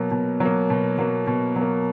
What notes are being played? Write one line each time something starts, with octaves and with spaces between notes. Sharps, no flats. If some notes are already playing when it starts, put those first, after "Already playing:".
Already playing: B2 F#3 A#3
B2
F#3 A#3
B2
F#3 A#3
B2
F#3
A#3